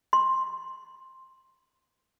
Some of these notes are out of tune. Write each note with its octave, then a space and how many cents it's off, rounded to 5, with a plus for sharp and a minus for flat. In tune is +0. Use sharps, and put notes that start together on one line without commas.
C6 +10